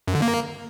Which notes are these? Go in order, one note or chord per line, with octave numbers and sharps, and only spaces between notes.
F#2
D3
A#3